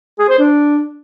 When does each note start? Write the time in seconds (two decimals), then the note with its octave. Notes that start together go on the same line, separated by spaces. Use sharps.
0.19 G#4
0.29 C5
0.39 D4